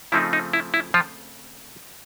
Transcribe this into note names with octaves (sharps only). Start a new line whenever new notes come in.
C#3 F3 A3 C4 D#4 E4
D#4
E4
E4
F3 F4